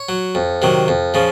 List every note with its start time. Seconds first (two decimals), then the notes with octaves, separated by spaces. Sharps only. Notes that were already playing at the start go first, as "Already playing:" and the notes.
Already playing: C#5
0.09 F#3
0.35 F2
0.62 C3 D#3 F#3
0.88 F2
1.14 C#3 F3